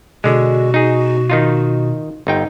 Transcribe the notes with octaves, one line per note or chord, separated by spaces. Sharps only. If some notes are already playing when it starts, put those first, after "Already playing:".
B2 D3 G#3 F#4
D#4 G#4
D#3 D#4 F4
G1 D#4 G5